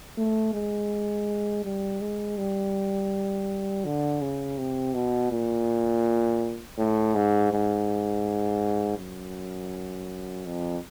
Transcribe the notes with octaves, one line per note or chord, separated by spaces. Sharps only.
A3
G#3
G3
G#3
G3
D3
C#3
C3
B2
A#2
A2
G#2
G#2
F#2
F2